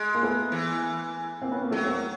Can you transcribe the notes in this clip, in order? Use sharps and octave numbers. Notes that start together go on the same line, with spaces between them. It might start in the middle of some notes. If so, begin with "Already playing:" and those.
Already playing: G#3
A#3
A3 B3
E3
A#3 C4
B3 C#4
A#3 C4
F#3 A3 B3
A#3 C4